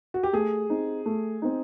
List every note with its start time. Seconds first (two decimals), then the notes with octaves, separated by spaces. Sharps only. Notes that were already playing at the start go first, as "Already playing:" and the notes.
0.14 F#4
0.23 G4
0.33 A3 G#4
0.70 C4 D#4
1.06 A3
1.42 C4 D#4